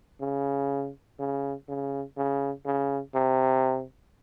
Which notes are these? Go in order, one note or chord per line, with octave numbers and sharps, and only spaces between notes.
C#3
C#3
C#3
C#3
C#3
C3